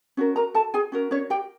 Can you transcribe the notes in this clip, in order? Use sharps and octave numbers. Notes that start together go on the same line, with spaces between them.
C#4 F#4 A#4
A#4 A#5
A4 A5
G#4 G#5
C#4 F#4 A#4
C#4 C#5
G4 G5